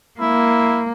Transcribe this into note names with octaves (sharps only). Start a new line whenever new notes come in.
A#3 E4